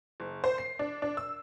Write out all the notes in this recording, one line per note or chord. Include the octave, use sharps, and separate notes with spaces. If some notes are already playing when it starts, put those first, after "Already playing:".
F#1
C5
C7
D4
D4
E6